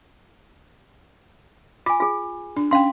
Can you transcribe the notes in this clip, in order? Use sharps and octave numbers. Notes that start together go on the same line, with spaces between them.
F4 G#5 D6
F4 G#4
D4
C#4 F5 G5 C6